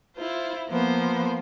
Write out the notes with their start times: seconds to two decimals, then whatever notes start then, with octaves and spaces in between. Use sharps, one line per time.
0.16 E4 F4 C5
0.69 F3 A#3 B3 C5